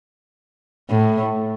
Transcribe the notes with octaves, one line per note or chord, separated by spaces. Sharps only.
A2